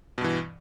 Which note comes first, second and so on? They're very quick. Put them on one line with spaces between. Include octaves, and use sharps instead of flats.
B2 G2 E3